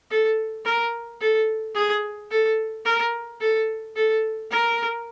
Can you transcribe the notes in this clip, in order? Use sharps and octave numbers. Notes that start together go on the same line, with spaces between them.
A4
A#4
A4
G#4
A4
A#4
A4
A4
A#4